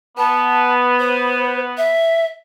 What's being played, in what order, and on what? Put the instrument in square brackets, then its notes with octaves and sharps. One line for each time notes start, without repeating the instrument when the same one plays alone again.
[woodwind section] B3 [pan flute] A5
[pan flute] C5
E5